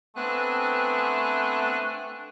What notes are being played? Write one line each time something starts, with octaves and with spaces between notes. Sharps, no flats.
A3 B3 C4 D4 G#5 F#6